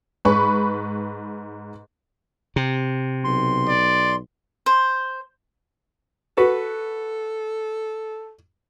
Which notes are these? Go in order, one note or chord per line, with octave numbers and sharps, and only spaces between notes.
G#2 B4 B5 C#6
C3
B1 C6
D5
C5
F#4 A4 B4